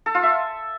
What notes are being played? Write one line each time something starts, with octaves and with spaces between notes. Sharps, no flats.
A4
F4
E5